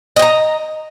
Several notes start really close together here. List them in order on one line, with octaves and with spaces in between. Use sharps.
D#5 G5 A#5